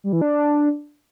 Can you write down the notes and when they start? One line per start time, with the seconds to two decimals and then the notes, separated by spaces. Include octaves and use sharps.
0.04 G3
0.13 E3
0.22 D4